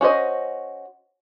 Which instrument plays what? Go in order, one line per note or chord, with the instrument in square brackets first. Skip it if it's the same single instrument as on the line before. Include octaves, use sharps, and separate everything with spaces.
[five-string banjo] C#4 F#4 C5 D#5